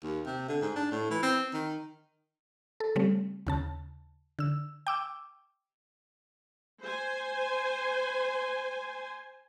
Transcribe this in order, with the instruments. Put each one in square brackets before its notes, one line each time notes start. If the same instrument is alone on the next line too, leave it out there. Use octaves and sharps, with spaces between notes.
[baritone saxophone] D#2
C3
D3
G#2
D4
A2
E3
C4
D#3
[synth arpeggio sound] A4
C#3 G3 A3 C4
D#2 C#3 A5
D3 E6
G5 D6 E6
[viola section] C5 G#5